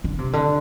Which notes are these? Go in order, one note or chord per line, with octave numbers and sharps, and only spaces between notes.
D3
C3
D3